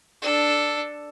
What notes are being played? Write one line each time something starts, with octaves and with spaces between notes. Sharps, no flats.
D4 A4